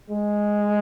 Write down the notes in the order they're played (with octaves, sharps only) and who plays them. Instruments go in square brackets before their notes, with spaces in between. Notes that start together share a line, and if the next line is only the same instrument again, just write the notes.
[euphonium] G#3